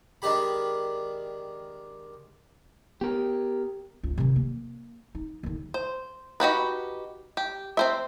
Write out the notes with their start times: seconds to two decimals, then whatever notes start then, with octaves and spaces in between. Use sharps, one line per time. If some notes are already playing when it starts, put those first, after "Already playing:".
0.22 D#3 G#3 D4 G4 B5
3.01 B3 G4 A#4
4.03 C#2 F4
4.18 C3 D#3
4.36 A#3
5.15 D#4
5.43 D#2 D3
5.74 C5
6.40 D#4 F#4 G4 B4
7.37 G4
7.77 C4 C5 E5